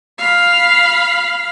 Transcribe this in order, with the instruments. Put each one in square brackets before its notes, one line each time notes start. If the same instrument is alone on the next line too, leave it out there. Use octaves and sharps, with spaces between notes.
[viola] F5 B5